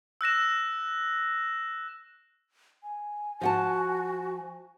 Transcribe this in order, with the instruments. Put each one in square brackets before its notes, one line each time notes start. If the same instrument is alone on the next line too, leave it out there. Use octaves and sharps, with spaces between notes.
[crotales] E6 F#6 A#6 E7
[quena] G#5
[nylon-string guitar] F3 F#5 A5 [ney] F#4